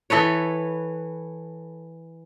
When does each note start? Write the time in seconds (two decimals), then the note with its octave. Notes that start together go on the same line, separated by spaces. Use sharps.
0.10 E3 A4 B4 C#5